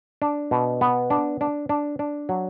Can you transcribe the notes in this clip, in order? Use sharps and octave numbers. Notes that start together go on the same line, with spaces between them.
D4
B2
B3
D4
D4
D4
D4
F#3